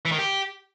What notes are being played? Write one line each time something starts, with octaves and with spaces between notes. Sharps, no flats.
E3
D#3
G4